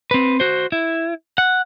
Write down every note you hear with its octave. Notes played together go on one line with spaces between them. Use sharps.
C4 B4
F#4 C5
E4
F#5